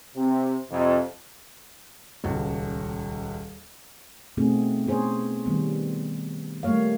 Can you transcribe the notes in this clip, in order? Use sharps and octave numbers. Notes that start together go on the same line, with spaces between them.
C3
F2 C3
D#1 C#2 F#4
B2 A3 C4 D#4 F#4 G#4
B3 C#4 G#4 C5 C#5
D#3 G3 B3
G3 A3 A#3 C#5 F5